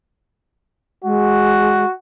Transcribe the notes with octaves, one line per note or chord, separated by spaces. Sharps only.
G#3 F#4